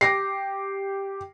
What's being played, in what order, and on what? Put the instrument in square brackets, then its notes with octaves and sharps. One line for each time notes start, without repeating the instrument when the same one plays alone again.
[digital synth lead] G4 [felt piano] D6 A#6 C7